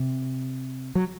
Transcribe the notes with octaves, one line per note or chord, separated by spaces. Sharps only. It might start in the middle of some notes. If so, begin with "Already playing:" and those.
Already playing: C3
F#3